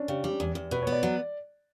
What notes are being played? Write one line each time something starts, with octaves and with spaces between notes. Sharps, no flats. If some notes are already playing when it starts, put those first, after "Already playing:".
Already playing: C#4 D4
C#3 G4
G3
E2
E2
B2 B4
B3 C#5
D5
F#3